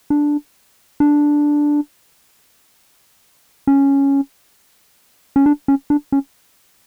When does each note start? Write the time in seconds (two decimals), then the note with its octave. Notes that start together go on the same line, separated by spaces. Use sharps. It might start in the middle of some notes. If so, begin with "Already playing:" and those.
0.10 D4
1.00 D4
3.67 C#4
5.36 C#4
5.46 D4
5.68 C#4
5.90 D4
6.12 C#4